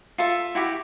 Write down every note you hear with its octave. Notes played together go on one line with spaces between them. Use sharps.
F4 A4 E5
E4 F#4 G4